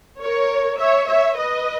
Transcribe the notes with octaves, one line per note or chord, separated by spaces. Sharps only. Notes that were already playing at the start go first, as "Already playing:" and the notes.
A#4 C#5
C#5 E5
C#5 E5
B4 D#5